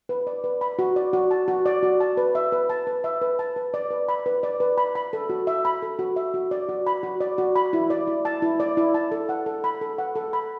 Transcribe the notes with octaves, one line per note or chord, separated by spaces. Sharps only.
B4
D5
B4
B5
F#4
D5
F#4
A5
F#4
D5
F#4
A5
B4
E5
B4
A5
B4
E5
B4
A5
B4
D5
B4
B5
B4
D5
B4
B5
B5
A4
F#4
E5
B5
A4
F#4
E5
F#4
D5
F#4
B5
F#4
D5
F#4
B5
E4
D5
E4
A5
E4
D5
E4
A5
A4
F#5
A4
B5
A4
F#5
A4
B5